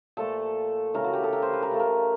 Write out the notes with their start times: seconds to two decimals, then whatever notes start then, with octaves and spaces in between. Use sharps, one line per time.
0.17 A#2 F3 A3 A4
0.94 C#3 E3 A3 A#4
1.04 F#4
1.13 G4
1.24 A4
1.33 A#4
1.42 C5
1.53 B4
1.63 A#4
1.71 C#3 F3 A3 A4
1.79 A#4